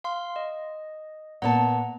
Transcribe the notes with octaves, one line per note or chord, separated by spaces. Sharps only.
F5 C6
D#5
A#2 B3 F#5 A5 A#5